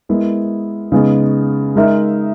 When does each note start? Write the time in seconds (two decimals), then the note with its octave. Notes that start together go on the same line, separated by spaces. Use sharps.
0.09 G#3 B3 E4 A#4
0.92 C#3 G#3 B3 D#4 G#4
1.76 G#3 D#4 A#4 E5